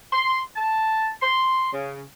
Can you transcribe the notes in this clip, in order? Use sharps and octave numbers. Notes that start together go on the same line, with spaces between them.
C6
A5
C6
C#3